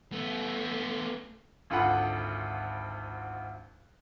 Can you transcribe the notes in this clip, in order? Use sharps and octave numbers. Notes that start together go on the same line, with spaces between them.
A3 B3
G#1 D2 F4 A4 F#5 B5